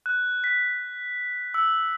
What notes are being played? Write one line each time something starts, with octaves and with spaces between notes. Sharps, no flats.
F#6
B6
E6